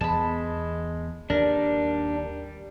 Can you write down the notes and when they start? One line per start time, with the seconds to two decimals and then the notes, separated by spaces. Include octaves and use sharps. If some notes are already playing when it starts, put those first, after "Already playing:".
0.01 E2 G#3 B3 A5 B5
1.30 D#2 G3 D4 A#4